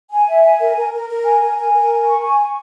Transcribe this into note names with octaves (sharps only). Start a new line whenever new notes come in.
G#5
E5
G#5
A#4
A#4
A#4
A#4
G#5
A#4
G#5
A#4
G#5
C#6
G#5
C#6